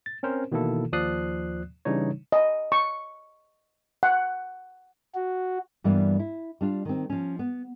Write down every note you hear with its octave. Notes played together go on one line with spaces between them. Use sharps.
A6
C4 C#4 A#4 C5
B2 D#3 E3 A#3 E4 A4
D#2 F3 D5 D#6 F#6 C7
C#3 E3 G3 D4 D#4 C#5
D#5
C#6
F#5
F#4
G2 E3 G3 A#3 B3 D4
E4
G3 D4 F4
D#3 C4
F3 C#4
B3